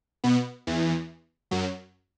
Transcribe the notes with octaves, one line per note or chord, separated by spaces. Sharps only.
B2 B3
E2 E3
F#2 F#3